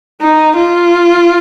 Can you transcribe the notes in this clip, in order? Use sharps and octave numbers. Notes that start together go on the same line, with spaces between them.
D#4
F4